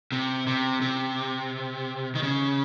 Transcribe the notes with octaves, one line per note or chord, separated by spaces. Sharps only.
C3
C3
C3
D#3
C#3